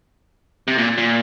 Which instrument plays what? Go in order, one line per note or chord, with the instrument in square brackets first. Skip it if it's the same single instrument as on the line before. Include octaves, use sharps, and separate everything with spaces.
[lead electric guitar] C3
A#2
A#2